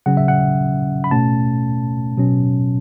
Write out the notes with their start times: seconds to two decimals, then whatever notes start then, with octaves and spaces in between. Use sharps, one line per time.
0.06 C#3 F#3 C#4 F#5
0.17 E5
0.28 F#5
1.04 B5
1.11 B2 A3 C#4 A5
2.17 B2 F#3 C#4